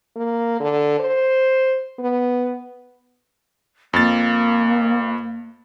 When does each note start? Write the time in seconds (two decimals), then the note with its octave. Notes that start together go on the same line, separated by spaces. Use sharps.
0.16 A#3
0.60 D3
0.99 C5
1.99 B3
3.93 F2 A#3 A6